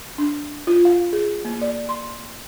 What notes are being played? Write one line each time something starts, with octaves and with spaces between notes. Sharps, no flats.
D4
F4
F5
G#4
A#3
D5
C6